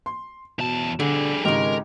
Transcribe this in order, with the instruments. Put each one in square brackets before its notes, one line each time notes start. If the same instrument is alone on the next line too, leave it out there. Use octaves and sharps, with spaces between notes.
[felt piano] C6
[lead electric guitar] E2 A5 [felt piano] B2
[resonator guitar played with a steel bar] D3 [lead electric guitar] G3 G#4
[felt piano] G#1 [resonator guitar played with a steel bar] C#3 G4 [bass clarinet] G#3 [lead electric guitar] A#4